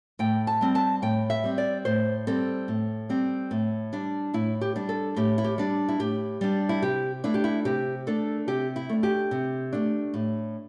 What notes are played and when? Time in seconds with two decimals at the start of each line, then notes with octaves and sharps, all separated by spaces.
0.19 A2 G5
0.47 A5
0.61 G3 C4
0.75 A5
1.02 A2 G5
1.30 E5
1.44 G3 C4
1.58 D5
1.85 A2 C5
2.27 G3 C4 A4
2.68 A2
3.09 G3 C4
3.51 A2
3.93 G3 D4
4.34 A2 E4
4.61 G4
4.76 G3 D4
4.89 A4
5.16 A2 G4
5.38 E4
5.44 G4
5.58 G3 D4
5.89 E4
6.00 A2 G4
6.41 G3 D4
6.69 E4
6.82 C3 G4
7.24 A3 D4 E4
7.34 G4
7.44 E4
7.65 C3 G4
8.07 A3 D4 A4
8.48 C3 G4
8.76 E4
8.89 A3 D4
9.03 G4
9.31 C3
9.73 A3 D4
10.14 A2